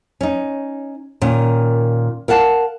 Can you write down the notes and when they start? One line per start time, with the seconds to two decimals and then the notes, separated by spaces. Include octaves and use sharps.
0.21 C#4 D#4
1.21 A#2 D#3 C#4
2.28 A#4 F5 F#5 A5